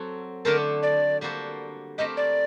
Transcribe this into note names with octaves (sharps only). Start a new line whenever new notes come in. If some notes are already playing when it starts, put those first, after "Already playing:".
Already playing: F#3 C4 F#4 A4
D3 A3 D4 A4 A#4 C5
D5
G3 A#3 F#4 A4 C5
A3 C4 G4 A#4 D#5
D5